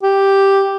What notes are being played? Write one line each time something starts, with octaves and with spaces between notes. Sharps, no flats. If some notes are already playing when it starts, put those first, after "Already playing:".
G4